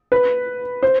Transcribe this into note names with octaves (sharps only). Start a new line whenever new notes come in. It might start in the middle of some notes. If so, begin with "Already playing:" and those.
B4
C5